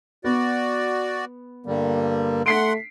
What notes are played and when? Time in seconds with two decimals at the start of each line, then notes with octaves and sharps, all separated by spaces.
0.24 B3 F#4 D5
1.66 G2 D3 G3 A#3
2.46 A3 F#5 C6 B6 C7 D7